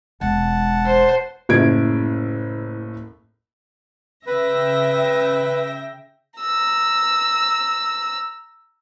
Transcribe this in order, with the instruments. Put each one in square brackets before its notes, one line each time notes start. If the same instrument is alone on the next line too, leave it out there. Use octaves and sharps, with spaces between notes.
[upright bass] E1 G#3 [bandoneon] F#5 A5
[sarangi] C5
[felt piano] F#1 A2 C#3 G#6 D7
[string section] C#3 A#6 [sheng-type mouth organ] B4 [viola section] E5 G5
[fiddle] A#5 E6